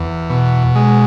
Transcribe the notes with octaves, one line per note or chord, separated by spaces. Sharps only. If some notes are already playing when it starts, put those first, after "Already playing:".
Already playing: E2
B2
G#3